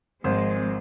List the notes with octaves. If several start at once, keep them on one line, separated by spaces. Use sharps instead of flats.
G#1 F3 G#3 C4 C5